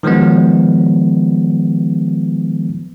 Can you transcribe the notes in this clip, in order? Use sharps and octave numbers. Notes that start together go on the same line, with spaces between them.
D#3 F3 F#3 G#3 B3